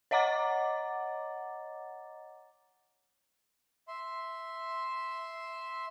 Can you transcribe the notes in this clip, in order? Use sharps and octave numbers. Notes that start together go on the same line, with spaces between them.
C#5 D#5 F#5 A#5 D6 A6
E5 C6